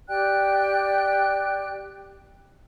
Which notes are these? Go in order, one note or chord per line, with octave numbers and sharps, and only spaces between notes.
G4 D5 G5 F#6